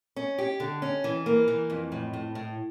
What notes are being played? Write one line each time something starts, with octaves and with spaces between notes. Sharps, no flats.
C#4
G4
D3
C#4
E3
A#3
E3
F2
A2
A2
A2